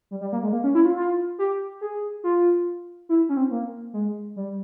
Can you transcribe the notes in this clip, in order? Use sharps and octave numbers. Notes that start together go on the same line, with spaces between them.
G3
G3
A#3
G#3
A#3
C#4
E4
F4
F4
G4
G#4
F4
E4
C#4
C4
A#3
G#3
G3